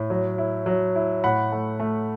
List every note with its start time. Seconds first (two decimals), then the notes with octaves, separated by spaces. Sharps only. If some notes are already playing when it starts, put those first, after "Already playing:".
Already playing: A2
0.10 F#3
0.38 E4
0.66 F#3
0.96 E4
1.24 A2 F#5 B5
1.52 A3
1.79 A3